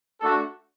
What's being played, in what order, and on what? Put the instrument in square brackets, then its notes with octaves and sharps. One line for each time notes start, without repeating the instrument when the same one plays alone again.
[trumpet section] A3 D4 F#4 A4